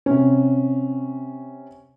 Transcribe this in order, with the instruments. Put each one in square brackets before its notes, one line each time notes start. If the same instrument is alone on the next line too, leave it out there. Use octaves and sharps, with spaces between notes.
[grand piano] C3 C#4